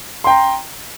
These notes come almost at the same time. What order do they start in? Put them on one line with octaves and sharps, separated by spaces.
C6 G5 A#5